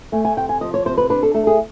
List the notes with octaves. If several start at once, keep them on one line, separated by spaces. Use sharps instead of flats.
A3 G#5
G#5
C3 G5
G#5
F3 D#5
C#5
C3 C5
B4
D4 B4
A4
A3 A4
G#4